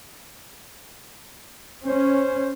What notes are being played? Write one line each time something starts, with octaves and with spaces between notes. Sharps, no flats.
C#4 C5